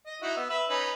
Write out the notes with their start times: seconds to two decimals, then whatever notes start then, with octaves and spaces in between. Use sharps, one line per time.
0.07 D#5
0.22 D#4 E4 F#4
0.37 B3 E6
0.50 B4 E5 E6
0.70 C#4 D#4 B4